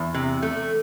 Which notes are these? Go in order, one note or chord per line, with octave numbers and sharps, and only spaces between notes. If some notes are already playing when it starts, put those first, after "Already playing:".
Already playing: E2
C3
A3